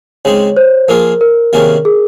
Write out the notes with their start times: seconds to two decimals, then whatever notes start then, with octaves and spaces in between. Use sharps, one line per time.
0.25 C#3 G#3 C4 D#4 G#4 C#5
0.57 C5
0.88 F3 A#3 F4 G#4 A#4
1.21 A#4
1.53 C3 D#3 A#3 C#4 G#4
1.85 G#4